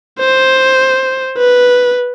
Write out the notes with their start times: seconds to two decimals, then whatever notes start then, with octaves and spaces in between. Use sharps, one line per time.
0.20 C5
1.38 B4